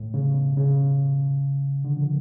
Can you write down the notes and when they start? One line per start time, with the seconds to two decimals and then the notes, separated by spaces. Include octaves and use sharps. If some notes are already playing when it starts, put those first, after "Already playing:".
Already playing: A2
0.14 C#3
0.34 B2
0.57 C#3
1.84 D3
1.97 F3